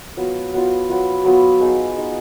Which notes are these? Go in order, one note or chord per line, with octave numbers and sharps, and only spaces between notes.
F#3 B3 F4
F#3 B3 F4
F#3 B3 F4
F#3 B3 F4
B3 D#4 G#4
B3 D#4 G#4